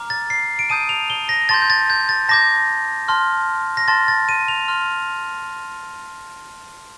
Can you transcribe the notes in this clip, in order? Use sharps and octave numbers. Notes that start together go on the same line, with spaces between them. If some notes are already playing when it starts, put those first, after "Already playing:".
Already playing: A#5 D6 F6
A6
C7
D7
A5 D#6 G6 D#7
F7
G7
A#6
A5 C6 G6 A6
G6
A6
G6
A6
A5 D6 G6 A#6
A5 C6 F6
A#6
A5 C6 F6 A6
A6
D#7
F7
C6 F6